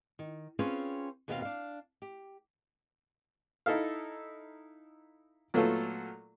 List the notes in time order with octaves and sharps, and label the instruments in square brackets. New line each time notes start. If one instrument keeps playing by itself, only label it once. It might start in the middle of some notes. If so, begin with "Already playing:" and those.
[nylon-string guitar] D#3
C4 C#4 F4 G#4 B4 C#5
D#2 B2 B3 C4 F#4 F5
D4 F5
G4
[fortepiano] D#4 E4 A4 E5 F5
A#2 F#3 A3 B3 F4 A4